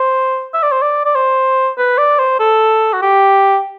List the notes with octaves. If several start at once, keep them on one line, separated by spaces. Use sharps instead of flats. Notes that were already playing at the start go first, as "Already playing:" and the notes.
Already playing: C5
E5
D5
C5
D5
D5
C5
B4
D5
C5
A4
F#4
G4